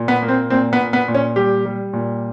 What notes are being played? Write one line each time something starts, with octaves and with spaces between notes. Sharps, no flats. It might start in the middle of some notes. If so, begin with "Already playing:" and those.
Already playing: A#2
B3
A#3
C4
A#2 C4
B3
A#2
B3
A#2
C#4
G3 G4
G3
A#2